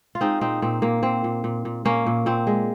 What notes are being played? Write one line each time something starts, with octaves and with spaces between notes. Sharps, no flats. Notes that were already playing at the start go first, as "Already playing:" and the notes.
F4
G#3 C4 D#4
A#2 C4 D#4
A#2 C4
A#2 A#3
A#2 C4
A#2
A#2
A#2
A#2 A#3 C#4
A#2
A#2 C4
G#3